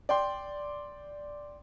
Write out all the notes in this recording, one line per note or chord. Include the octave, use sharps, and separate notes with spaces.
D5 G5 C6